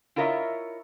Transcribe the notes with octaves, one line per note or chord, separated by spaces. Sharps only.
E4 F4 A#4 C#5 D#5 E5